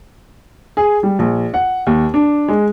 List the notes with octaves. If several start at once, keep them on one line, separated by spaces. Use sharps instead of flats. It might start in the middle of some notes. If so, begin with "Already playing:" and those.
G#4
G3
A#1
F#5
D#2
D4
G#3